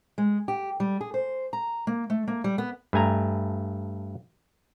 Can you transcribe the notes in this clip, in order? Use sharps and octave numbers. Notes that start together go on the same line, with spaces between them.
G#3
G4
G3
G#4
C5
A#5
A#3
A3
A#3
G3
B3
G2 A3 G#5 A#5